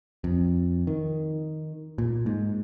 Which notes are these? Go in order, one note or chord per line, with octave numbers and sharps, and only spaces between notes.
F2
D#3
A#2
G#2